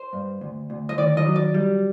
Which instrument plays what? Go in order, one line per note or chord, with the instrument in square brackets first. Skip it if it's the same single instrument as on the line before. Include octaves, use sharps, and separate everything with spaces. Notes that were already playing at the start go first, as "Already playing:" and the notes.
Already playing: [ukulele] C5
[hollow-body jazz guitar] G2
D2
D2
[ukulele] D#5
[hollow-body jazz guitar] D#3 [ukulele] D5
[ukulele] D#5
[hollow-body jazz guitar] F#3
[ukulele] D5
[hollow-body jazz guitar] G3